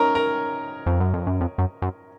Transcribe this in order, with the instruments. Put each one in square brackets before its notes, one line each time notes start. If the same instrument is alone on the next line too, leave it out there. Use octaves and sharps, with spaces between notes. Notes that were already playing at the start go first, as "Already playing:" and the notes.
Already playing: [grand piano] C#4 D#4 A#4 C#5 A#5
A#4 A#5
[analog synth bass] F2
F#2
F2
F#2
F2
F#2
F#2